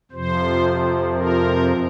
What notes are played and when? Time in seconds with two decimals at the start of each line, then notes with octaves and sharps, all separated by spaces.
0.11 F2 C3 F3 C5
1.13 A#4